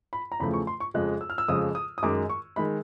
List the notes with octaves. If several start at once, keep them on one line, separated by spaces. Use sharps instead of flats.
B5
A#5
E2 C#3 F3 A3 B5
C#6
C6
C#6
F2 C#3 F3 G#3 F#6
E6
F6
E6
F2 C#3 F3 G#3 D#6
D#6
D#6
F#2 D#3 G#3 D6
C#6
D#3 G#3 B5